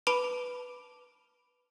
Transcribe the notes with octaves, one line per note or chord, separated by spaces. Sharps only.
B4 A5 B5 D6 D7